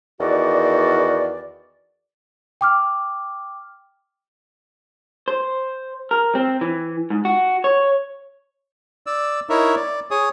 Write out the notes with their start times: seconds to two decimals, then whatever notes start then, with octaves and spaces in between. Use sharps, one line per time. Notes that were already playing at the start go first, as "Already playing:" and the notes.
0.20 E2 D#3 F#4 D5
2.61 G5 D6 F6
5.28 C5
6.11 A#4
6.35 C4
6.61 E3
7.10 G#2
7.25 F#4
7.64 C#5
9.06 D5 E6
9.50 D#4 E4 A#4 C#5 E5
9.76 D5
10.11 G#4 C#5 D#6